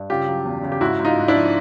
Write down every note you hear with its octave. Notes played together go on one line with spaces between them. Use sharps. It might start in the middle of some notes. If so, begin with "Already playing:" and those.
Already playing: G2
C#3 F4 G4
F#3
E2
C#3
G4
G#2 E4 F#4
G#2
D#4 F4
G#2
D4 E4
F3